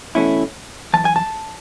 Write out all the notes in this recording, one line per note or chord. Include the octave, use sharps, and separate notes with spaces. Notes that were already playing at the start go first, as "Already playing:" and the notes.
E2 B2 A3 C#4 E4
F#2 E3 A5
G#5
A5